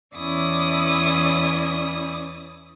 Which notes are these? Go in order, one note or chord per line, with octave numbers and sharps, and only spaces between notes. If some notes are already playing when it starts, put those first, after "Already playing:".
E2 C#4 E4 D5 D#6